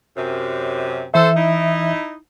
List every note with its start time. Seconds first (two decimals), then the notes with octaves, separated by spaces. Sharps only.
0.17 F#2 C3
1.14 E3 A4 C5 E5
1.36 D#4 E4